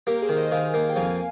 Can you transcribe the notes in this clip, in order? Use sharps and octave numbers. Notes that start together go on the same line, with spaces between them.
A#3 G4 A#4
G#4 C5
D#3
C5 D#5
D#3 F5 G#5
A#3
G5
F2 F5 G#5